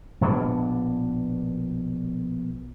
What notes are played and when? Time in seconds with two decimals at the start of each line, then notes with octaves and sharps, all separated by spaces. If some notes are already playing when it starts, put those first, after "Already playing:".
0.21 A#1 B2 B3 D4